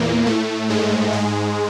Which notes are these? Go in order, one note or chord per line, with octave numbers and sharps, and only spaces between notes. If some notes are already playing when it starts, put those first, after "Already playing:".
Already playing: E2 A#2 E3 A#3
A2 A3
G#2 G#3
G#2 G#3